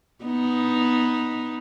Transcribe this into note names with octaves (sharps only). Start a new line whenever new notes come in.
B3 D#4